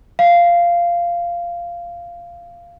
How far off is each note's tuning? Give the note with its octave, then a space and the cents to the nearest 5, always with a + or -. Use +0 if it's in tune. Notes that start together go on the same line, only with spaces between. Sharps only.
F5 -10